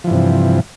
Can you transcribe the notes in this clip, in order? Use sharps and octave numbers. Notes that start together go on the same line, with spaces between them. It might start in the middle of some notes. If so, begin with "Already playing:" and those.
G2 C3 E3 F3